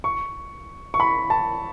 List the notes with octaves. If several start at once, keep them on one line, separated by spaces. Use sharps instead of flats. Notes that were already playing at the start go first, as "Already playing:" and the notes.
C#6
C#6
B5
A5